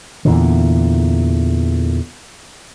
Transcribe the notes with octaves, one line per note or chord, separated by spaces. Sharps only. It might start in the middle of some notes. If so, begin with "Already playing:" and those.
E2 A#2 D3